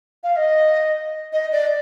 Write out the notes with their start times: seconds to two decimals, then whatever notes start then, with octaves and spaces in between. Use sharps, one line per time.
0.24 F5
0.36 D#5
1.33 D#5
1.52 D5